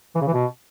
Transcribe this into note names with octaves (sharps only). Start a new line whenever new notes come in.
E3
C#3
E3
B2